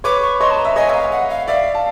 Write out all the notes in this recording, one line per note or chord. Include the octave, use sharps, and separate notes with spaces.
B4 C#5 D6
C#6
C#5 D#5 C6
A5
A#5
E5
C#5 D#5 G#5
E5
F5
F#5
F5
D5 E5 F5
A5